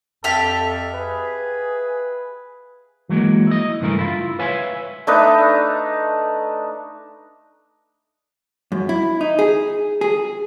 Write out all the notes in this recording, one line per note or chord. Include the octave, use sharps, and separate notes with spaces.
F2 G4 A4 E5 F5
G#4 B4
E3 F#3 G#3 A#3
E4 D#5
G2 C#3 E3 G#3 A3 A#4
E4 F4
B4 C#5 E5 F5 G#5
A3 D4 D#4 B4
F#2
E4
D#4
G#4
G#4